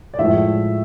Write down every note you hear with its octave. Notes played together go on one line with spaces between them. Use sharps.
D5
A2 F3 G#3 E5